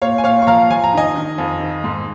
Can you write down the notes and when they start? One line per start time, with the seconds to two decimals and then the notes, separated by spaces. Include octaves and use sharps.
0.02 A#2 C#5 F5
0.18 G#5
0.24 A#2 C#5 F5
0.42 C#6
0.47 F3 F5 A#5
0.70 F3 G#5
0.84 A#5
0.93 D#3 D#5 G#5
1.16 D#3
1.38 F2
1.61 D#3
1.84 G#2